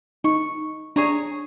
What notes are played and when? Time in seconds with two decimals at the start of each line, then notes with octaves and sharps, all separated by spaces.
0.24 D#4 C#6
0.96 D4 G#4 C#5 A#5